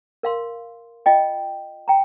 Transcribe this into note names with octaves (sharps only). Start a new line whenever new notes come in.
A#4 F5 C6
F4 D#5 G5
G5 A#5